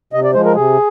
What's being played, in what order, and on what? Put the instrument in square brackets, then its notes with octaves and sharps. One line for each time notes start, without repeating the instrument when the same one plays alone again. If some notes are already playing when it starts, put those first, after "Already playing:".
[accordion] C3 D#5
D5
F3 G#3 C5
A#4
C3 G#4